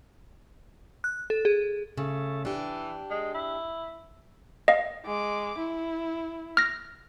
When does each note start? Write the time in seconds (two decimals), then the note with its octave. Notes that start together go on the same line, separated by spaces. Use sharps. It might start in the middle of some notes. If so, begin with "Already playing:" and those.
1.04 F#6
1.30 A4
1.45 G#4
1.97 C#3 A3
2.45 E3 D4 G4
3.10 G#3
3.34 E4
4.68 D#5 F5
5.05 G#3 D6
5.58 E4
6.57 F6 A#6